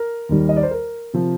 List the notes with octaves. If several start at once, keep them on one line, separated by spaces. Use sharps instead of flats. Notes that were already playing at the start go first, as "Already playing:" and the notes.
Already playing: A#4
D#2 D#3 G3
D#5
D5
C5
A#4
C3 F3